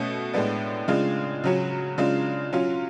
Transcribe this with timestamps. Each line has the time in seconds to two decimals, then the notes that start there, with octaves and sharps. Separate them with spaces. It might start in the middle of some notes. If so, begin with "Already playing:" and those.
Already playing: B2 A3 C#4
0.34 A2 G#3 B3 D4
0.88 C#3 G#3 D4 F4
1.44 C#3 F#3 C#4
1.98 C#3 G#3 D4 F4
2.53 F#3 C#4 F4